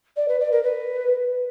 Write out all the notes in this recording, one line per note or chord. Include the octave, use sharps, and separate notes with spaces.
D5
B4
D5
A#4
B4